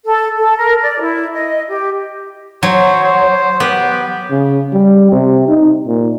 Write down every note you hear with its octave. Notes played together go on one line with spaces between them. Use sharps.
A4
A4
A#4
D5
E4
D#5
G4
F#3 C5 C#5
C5
B3 G4
C#3
G3
C3
D#4
A#2